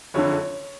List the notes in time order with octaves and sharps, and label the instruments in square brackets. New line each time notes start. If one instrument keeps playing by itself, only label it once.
[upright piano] F#1 F2 D3 C#5